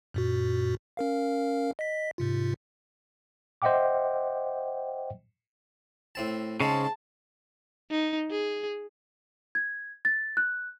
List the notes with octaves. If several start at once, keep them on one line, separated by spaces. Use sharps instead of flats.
F#2 A#2 F#4
C#4 A#4 F5
D#5 B6
G#2 C3 F4
C5 D#5 E5 F#5 G5 D6
A2 C4 A5
G#2 C#3 G#3 C4 A5
D#4
G#4
G#6
A6
F#6